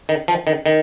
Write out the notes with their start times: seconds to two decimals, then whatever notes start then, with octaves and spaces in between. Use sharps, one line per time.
0.09 D#3
0.28 F3
0.47 D#3
0.66 D#3